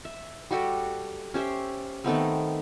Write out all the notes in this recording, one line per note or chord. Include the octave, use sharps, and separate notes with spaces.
E5
G3 F#4 G4 A4
C#4 G4 C5 E5
D#3 A3 B3 C4